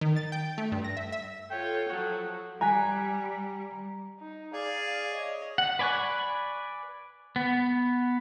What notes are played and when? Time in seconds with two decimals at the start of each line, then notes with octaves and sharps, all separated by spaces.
0.01 D#3
0.16 A6
0.32 G5
0.58 A3
0.72 G2
0.84 A#6
0.97 E5
1.12 E5
1.50 F4 A4 C#5 G5
1.89 F3 F#3 F#4
2.61 G3 G#5 A#5 F#6 B6
4.19 D#4
4.53 G#4 D5 F5
5.11 C#5 D#5
5.58 F#5
5.79 B4 D5 G#5 C#6 F#6
7.36 B3